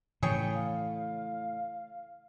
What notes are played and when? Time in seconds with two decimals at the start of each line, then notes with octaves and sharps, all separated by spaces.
0.23 A2 C#3 E3 F3 G#4 C#5 G5
0.55 F5